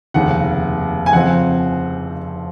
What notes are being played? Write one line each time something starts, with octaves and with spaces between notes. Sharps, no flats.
F1 D#2 C#3 F#5
G#5
F2 C#3 F3 C4 F#5